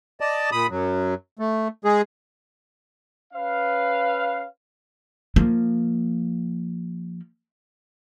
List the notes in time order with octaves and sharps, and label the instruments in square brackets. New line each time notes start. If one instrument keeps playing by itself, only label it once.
[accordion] D5 D#5 A5
A#2 B5 D#6
F#2 F#3
A3
G#3 G#4
[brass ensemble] C#4 B4 F5
[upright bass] F3 A#3